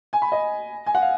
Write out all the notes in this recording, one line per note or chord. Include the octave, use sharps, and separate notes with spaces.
G#5
B5
D#5
G#5
F#5
F5